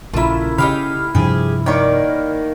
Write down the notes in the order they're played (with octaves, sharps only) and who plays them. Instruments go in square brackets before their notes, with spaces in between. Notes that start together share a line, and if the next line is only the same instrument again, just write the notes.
[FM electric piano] A#1 C#3 B5 [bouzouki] A#3 F4 [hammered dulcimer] E4 A4
[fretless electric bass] C#3 [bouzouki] D#4 G4 F5 [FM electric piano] B5 F6
[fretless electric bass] G2 C3 F3 [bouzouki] G4 G#4
[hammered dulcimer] D#3 A#3 C#6 [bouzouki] C#5 D5